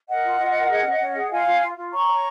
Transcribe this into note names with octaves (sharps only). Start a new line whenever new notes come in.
A#4 D#5 F#5
F4
F4
A#4
G#4
C#4
C#4
G#4
F4 F5 G#5
F4
F4
F4
C#5 A#5 C#6
C#5